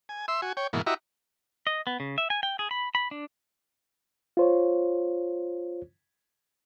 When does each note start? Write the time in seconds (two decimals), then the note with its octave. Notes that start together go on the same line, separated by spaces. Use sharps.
0.09 G#5
0.28 E5 C6 E6
0.42 F#4 G#5
0.57 C#5 G5
0.73 G#2 B2 E3 A#3
0.87 E4 F#4 G4 D#5 E5 A#5
1.67 D#5
1.87 B3
2.00 C#3
2.18 E5
2.30 G#5
2.43 G5
2.59 G#4
2.71 B5
2.95 B5
3.11 D4
4.37 F4 C5 C#5